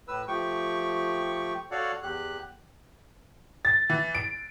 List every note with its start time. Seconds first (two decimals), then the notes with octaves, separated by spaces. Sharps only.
0.08 A2 B4 E6
0.28 F3 A3 G4 G5 C#6
1.71 F#4 A4 C#5 D5 F5 F#5
2.03 E2 G4 F#6
3.65 A6
3.90 E3
4.15 D7